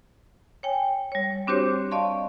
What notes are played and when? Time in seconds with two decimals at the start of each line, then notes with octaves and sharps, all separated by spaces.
0.63 C#5 G5 G#5
1.12 G3 C#5
1.47 C4 D4 F#4 G4 C5 C#5
1.91 D5 D#5 F5 A5 C6 C#6